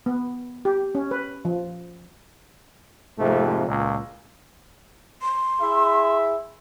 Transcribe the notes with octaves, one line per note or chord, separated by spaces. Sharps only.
B3
G4
C#4
B4
F3
F2 G#2 C3 A3 A#3
C#2 A#2
C6
E4 G#4 E5